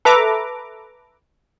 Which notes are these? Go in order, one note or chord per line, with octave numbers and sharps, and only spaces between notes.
A4 B4 E5 A#5 D6